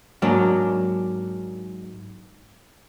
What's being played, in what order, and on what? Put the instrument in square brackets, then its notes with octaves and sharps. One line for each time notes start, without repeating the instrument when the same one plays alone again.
[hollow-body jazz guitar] G#2 F#3 A#3 D4